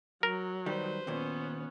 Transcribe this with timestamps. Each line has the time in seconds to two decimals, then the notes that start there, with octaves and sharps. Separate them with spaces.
0.23 F#3 A#4
0.66 D#3 G3 B4 C5
1.07 D#2 A#2 B3 C#4